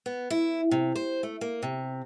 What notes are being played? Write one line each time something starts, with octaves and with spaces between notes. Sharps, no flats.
B3
E4
C3
C5
A3
A#3
C3